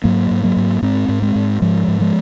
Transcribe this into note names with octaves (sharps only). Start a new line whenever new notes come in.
G#2 F#3 A#3
G#2
F#3 A#3
G#2
G#2 G#3 C4
G#2
G#3 C4
G#2
G#2 F3 G#3
G#2
F3 G#3